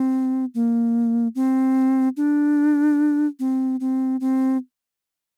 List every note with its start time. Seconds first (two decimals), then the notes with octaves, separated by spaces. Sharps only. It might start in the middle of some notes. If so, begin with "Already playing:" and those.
Already playing: C4
0.54 A#3
1.35 C4
2.17 D4
3.39 C4
3.80 C4
4.20 C4